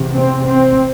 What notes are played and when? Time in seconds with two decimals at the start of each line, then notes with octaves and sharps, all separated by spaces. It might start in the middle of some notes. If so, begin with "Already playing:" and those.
Already playing: E2 C3
0.15 C4
0.44 C4